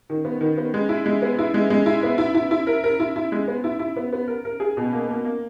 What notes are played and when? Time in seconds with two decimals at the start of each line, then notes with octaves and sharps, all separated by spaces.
0.10 D#3
0.25 B3
0.41 D#3
0.57 B3
0.74 G#3
0.89 E4
1.06 G#3
1.22 B3
1.39 E4
1.54 G#3
1.70 G#3
1.86 E4
2.03 B3
2.18 E4
2.35 E4
2.51 E4
2.67 A#4
2.84 A#4
3.00 E4
3.16 E4
3.32 G#3
3.48 B3
3.64 E4
3.79 E4
3.96 B3
4.13 B3
4.28 A#4
4.45 A#4
4.60 G#4
4.77 B2
4.92 A#3
5.08 A#3
5.25 A#3